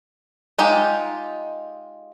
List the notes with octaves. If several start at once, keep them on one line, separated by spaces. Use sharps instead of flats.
G#3 D#4 F4 G4